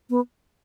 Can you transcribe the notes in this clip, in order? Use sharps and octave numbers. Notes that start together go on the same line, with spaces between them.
B3